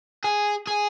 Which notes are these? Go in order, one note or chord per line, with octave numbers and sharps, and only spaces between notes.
G#4
G#4